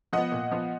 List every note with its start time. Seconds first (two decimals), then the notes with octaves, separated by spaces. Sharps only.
0.13 F3 B3 D#5 F#5
0.32 A#2
0.51 F3 B3